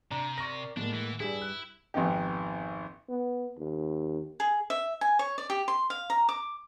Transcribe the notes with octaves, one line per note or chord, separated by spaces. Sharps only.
C3 D4 A#5
A#4 D5 C#6 A#6
A2 G#3 A#3 D4 F#5
E3
G2 G3 E4 G#4 B6
F#6
G#1 F2 B3 D#4 G4
B3
D#2
G#4
E5
G#5
C#5
D5
G4
C6
F5
A#5
D6